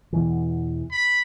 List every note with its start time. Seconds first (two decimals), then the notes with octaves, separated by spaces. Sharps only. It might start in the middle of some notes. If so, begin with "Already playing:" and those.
0.13 E2 B2 E3
0.92 B5